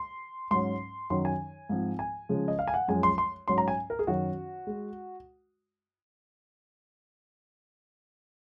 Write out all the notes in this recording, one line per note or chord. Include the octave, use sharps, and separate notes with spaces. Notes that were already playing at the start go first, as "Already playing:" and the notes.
Already playing: C6
G#2 F#3 C#4 C6
F#2 D#3 F#3 C#4 C6
G#5
G#2 F3 C4
G#5
C#3 F3 G#3
D#5
F5
G#5
F#5
F#2 F3 G#3 C#4 G#5
C6
C6
G#2 F#3 C#4 C6
A#5
G#5
A#4
G#4
F#2 D#3 F#3 C#4 F#4
G#3